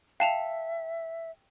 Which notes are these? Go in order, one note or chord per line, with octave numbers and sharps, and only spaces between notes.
E5 F5 G5 A5 F7